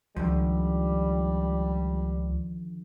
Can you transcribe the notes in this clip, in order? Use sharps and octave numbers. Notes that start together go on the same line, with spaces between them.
C#2 D3 D#3 F3 G3